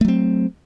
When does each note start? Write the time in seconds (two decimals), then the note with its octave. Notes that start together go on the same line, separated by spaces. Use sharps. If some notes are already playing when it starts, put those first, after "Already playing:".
0.01 A3
0.05 F#3
0.08 C4